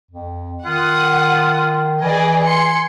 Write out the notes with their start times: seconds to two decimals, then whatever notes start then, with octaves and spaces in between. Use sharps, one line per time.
0.11 F2
0.66 D#3 F4 F#5 D#6
2.01 E3 G#4 D5 D#5 G#5
2.46 C6 C#7